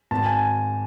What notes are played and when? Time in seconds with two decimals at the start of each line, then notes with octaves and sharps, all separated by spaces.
0.11 G#1 A5
0.26 G#5